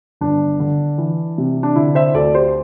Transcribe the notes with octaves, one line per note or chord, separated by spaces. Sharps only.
G1 D4
D3
E3
C3
D4
D3 E4
C5 E5
D2 A4 D5
G4 C5